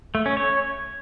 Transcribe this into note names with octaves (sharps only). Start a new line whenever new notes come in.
A3
C#4
C#5